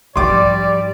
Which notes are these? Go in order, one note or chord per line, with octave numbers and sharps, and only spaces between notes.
G#2 F3 G3 D5 C6 D6